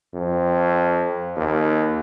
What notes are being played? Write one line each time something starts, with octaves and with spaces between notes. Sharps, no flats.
F2
D#2